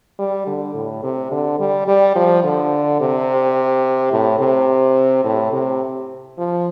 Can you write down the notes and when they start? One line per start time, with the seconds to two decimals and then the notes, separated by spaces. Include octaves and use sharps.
0.19 G3
0.47 D3
0.75 A2
1.03 C3
1.31 D3
1.59 G3
1.87 G3
2.16 F3
2.44 D3
3.00 C3
4.12 A2
4.40 C3
5.24 A2
5.53 C3
6.38 F3